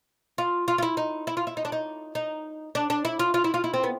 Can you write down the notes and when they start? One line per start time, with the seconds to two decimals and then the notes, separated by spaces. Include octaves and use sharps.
0.38 F4
0.68 F4
0.78 F4
0.83 E4
0.97 D#4
1.27 E4
1.37 F4
1.47 E4
1.57 D#4
1.65 D4
1.72 D#4
2.15 D#4
2.75 D4
2.90 D4
3.05 E4
3.19 F4
3.34 F4
3.44 E4
3.54 F4
3.64 E4
3.74 C4
3.84 B3